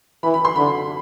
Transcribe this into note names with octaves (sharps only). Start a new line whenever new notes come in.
E3 B5
B5
C6
D3 B5